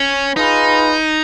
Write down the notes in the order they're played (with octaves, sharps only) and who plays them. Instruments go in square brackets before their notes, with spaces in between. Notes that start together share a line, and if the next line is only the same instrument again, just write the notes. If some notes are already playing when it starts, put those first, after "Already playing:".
Already playing: [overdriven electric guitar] C#4
[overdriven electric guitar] D#4 [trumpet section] F4 G#4 B4